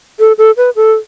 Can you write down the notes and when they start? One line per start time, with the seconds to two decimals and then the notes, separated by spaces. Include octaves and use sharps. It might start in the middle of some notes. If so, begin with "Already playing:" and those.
0.19 A4
0.38 A4
0.57 B4
0.76 A4